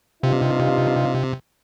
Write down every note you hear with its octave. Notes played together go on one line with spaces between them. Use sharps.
G2 C3 D#4 F4